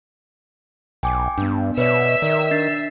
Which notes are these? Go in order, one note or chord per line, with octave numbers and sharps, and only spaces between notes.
B1 G5 G#5 D6
G2 B3 D4
B2 B4 C#5 D5 E5 E6
D#3 A#4 D5
D4 A6 C7